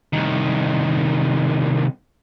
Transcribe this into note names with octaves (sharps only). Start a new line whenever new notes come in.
C2 D#3